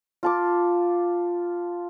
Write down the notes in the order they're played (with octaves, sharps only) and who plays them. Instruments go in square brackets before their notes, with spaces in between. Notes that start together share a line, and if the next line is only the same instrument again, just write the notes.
[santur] F4 A5 D6